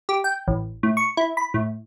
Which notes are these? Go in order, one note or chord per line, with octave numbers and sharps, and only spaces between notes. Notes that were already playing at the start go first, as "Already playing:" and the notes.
G4
G5
A1
A2
C#6
E4
B5
A2